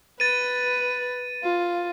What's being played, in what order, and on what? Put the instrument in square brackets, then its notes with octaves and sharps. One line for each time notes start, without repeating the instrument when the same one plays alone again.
[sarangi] B4 [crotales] A6 D#7
[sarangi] F4